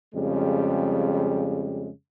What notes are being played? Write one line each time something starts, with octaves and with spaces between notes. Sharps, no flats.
F2 C#3 G3 G#3